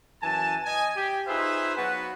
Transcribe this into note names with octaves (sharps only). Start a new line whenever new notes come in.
F#2 E3 G#5 A5
D#5 G#5
G4
D#4 F4 G#4 B4 C5 E5
F#3 B3 F#4 B4